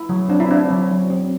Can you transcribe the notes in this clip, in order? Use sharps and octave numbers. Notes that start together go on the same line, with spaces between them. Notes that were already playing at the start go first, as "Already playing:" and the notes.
Already playing: E4
F#3
C4 D4
E4
C4 D4
F#3
F#3
C4